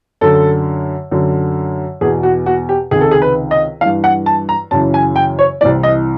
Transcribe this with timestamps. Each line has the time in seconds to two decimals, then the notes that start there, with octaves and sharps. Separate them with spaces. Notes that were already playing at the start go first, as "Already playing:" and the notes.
0.21 F#2 D3 A4
1.11 F#2 D3
2.01 E2 B2 G#4
2.23 F#4
2.46 F#4
2.69 G4
2.91 C#2 C3 D#3 G#4
3.01 A4
3.11 G#4
3.22 B4
3.51 D#5
3.81 G2 E3 F5
4.04 F#5
4.26 A5
4.49 A#5
4.71 F#2 C#3 E3 A5
4.94 G#5
5.16 G5
5.39 C#5
5.61 C2 C3 E3 D5
5.83 D#5